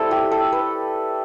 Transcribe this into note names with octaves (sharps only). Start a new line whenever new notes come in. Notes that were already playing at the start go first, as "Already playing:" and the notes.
Already playing: G3 C4 E4 A4
G4
A4
B4